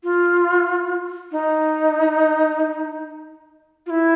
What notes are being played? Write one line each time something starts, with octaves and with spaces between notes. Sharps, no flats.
F4
D#4
F4
E4